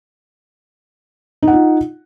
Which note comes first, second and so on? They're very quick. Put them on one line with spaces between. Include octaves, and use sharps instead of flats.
D#4 F#5 F4